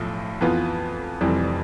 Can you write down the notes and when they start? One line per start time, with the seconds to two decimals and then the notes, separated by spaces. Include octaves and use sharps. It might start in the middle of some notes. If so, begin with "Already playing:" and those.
Already playing: B1 A2 F3 E4
0.41 F2 E3 B3 F4 B4
1.21 F1 F2 E3 G3 C4